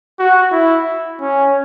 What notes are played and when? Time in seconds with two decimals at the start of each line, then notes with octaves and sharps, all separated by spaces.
0.19 F#4
0.52 E4
1.21 C#4